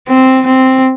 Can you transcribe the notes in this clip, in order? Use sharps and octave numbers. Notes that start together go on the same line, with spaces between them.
C4
C4